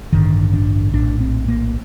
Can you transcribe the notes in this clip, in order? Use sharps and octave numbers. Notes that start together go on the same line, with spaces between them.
A1 G2 D3 D#3
D4
A#1 A2 D4
C4
A#3